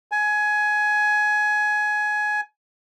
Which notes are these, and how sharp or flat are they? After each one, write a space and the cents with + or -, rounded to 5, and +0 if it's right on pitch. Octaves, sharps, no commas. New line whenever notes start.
G#5 +20